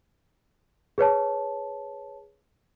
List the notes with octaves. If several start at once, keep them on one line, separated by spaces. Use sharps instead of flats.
G#4 B4 C#5 A5